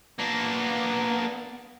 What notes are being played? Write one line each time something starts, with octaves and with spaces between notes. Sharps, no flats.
A#3 B3 D4